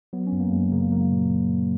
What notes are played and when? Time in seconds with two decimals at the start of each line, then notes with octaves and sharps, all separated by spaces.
0.13 F#3 B3
0.27 C#4
0.32 F#2
0.40 A#3
0.52 F#2 G#3
0.72 C#3 A#3
0.92 F#3 A#3
1.12 A#2